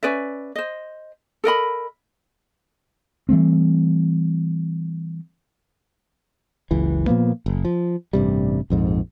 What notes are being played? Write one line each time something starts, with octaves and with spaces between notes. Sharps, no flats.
C#4 B4 D5 E5
C5 D#5
A4 A#4 D#5 B5
E3 G3 A3 C4
F#1 C#2 E3
A#2 F3 A#3 B3
F#1
F3
A1 G2 C3 G3
A#1 F2 G#2